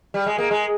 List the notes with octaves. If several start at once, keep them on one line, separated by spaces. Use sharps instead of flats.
G3
G#3
A#3
G#3